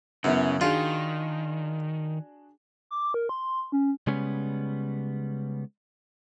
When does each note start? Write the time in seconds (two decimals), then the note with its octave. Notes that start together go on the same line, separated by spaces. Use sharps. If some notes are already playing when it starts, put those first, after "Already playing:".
0.24 F#2 C#3 B3 E4
0.61 D#3 D4 F4 F#4 G#4
2.91 D6
3.14 A#4
3.29 C6
3.72 C#4
4.07 C#3 G3 G#3 B3 C#4